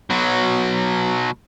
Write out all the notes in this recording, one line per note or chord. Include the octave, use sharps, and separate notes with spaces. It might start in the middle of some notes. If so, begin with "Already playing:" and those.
B2 F#3